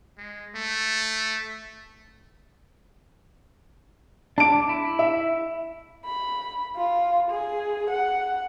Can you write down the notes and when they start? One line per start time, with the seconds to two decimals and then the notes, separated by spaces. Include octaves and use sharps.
0.18 G#3
0.55 A3
4.38 D4 A5 D6 D7
4.69 E4
4.99 E5
6.05 B5
6.76 F4
7.30 G#4
7.90 F#5